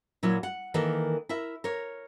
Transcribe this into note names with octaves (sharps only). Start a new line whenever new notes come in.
A#2 F#3 E4
F#5
D#3 E3 A#3 A4 A#4
E4 A#4 E5
A#4 C#5